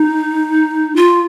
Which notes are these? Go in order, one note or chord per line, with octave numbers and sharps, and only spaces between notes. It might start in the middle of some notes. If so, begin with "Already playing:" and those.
Already playing: D#4
F4